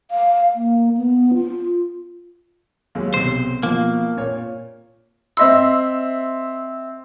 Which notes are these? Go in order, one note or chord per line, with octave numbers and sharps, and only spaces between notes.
F5
A#3
B3
F4
D#2 F#3 G#3
B1 C3 C5
B2 F3 A#3
A#2 C#5
C4 D#5 E5 C6 E6